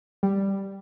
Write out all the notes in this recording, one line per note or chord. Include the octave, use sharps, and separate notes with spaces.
G3